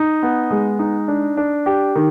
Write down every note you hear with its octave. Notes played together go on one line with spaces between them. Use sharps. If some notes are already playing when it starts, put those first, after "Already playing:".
Already playing: D#4
B3
G#3
D#4
D4
D4
G4
D#3